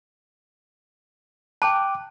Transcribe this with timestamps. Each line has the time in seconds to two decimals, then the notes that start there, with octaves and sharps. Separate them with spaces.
1.62 G5 A5 D6 F#6